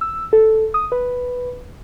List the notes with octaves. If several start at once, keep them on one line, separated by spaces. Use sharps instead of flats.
E6
A4
D#6
B4